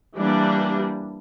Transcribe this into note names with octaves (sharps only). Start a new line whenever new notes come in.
E3 G3 A#3 D4